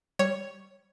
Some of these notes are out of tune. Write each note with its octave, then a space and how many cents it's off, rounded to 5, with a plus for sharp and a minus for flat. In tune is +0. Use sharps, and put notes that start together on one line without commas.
G3 +0 C#5 +0